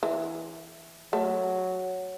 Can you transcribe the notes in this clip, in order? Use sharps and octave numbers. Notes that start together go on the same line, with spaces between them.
E3
F#3 A3